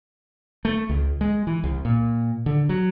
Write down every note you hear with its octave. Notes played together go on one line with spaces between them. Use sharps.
A3
C#2
G#3
E3
C2
A#2
D3
F#3